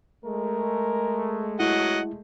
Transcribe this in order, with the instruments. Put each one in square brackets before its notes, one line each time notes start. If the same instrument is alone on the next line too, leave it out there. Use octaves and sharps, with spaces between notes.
[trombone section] G#3 A3 [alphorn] A#4
[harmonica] F#3 D#5 F#5 [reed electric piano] E4